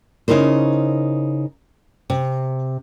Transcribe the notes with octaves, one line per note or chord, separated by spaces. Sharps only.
C#3 D#4 E4 A#4 C5
C3